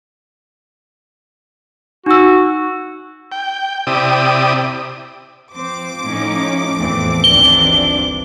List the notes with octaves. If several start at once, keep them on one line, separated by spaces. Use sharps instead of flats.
D#4 F#4 E6
G5
C3 E4 G4 D5 D#6
F3 C4 C5 D6
A2 C#4 D#4
E2 A2 E3 A3 C4
G1 D2 D#3 E3 C4 D4 G7